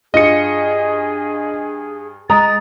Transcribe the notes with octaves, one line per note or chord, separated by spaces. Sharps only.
G2 F4 G#4 D#5 C#7
G#3 A#5 D#6 A6